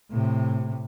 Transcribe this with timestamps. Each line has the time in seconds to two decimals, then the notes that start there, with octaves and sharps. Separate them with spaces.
0.11 A2 C3